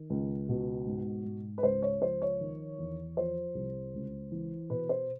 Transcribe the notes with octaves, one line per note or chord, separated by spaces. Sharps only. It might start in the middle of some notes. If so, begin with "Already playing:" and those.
Already playing: D#3
C#2
B2
G#2
G#2
B4
C#2 C5
C#5
F3 C5
C#5
D#3
E2
F3 C5
C2
C#2
E3
B2 B4
C5